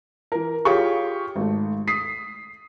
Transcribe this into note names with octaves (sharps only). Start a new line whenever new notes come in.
E3 A#4
F4 G4 G#4 C#5 F5 C#6
G#1 A3
D#6 B6 C7